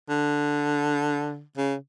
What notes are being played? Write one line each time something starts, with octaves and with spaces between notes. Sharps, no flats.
D3
C#3